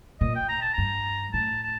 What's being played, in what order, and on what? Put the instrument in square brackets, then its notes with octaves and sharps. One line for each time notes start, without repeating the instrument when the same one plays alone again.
[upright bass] A#2 [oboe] D#5
[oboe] G5
A#5
A5
[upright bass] G2 [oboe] A#5
[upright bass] A2 [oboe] A5
[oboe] A5